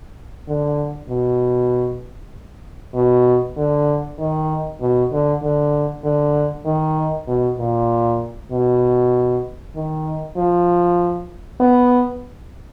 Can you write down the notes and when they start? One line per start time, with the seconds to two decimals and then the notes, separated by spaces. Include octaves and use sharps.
0.48 D3
1.09 B2
2.94 B2
3.57 D3
4.19 D#3
4.81 B2
5.12 D3
5.43 D3
6.04 D3
6.66 D#3
7.28 B2
7.59 A#2
8.51 B2
9.76 D#3
10.37 F3
11.60 B3